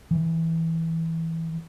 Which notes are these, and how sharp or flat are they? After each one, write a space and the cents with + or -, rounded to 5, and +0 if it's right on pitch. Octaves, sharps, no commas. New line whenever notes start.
E3 -10